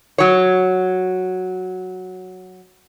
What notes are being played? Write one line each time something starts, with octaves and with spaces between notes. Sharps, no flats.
F#3 C#5